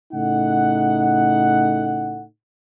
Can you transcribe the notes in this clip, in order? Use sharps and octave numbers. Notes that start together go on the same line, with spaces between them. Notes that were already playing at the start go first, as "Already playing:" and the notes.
A2 C#3 A3 D#4 F#5